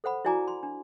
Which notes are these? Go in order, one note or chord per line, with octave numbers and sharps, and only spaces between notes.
A4 C5 F#5 B5
E4 F#4 D5 G#5 A#5 D6
C6
D4